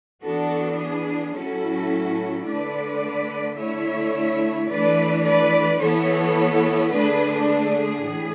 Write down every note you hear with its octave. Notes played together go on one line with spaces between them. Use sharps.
E3 B3 D4 F#4 A4
G#4
A2 F#3 C#4 E4 F#4 A4
D3 A3 D4 B4 D5
D3 A3 E4 C#5 E5
E3 A3 D4 B4 D5
B4 D5
E3 B3 E4 A4 C#5
D3 A3 D4 G#4 B4
G#4
A2 E3